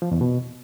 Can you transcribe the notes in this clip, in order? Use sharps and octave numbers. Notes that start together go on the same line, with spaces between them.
F3
E2
B2